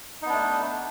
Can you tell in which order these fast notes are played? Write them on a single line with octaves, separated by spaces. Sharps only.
D#4 B3 D4 A3